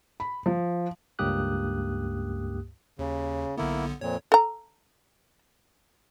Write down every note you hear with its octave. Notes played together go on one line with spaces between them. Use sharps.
B5
F3
C#2 G2 A#3 G4 D#6 F#6
D#2 C#3
B1 D3 A#3 B3 E4
F2 A#2 C#5
A4 A#5